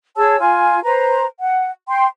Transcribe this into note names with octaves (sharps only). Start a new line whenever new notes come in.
G#4 C#5 A5 E6
F4 G#5
B4 C5 A#5
F#5
G5 C6